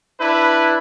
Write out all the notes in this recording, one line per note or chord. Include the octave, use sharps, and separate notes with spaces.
D4 E4 B4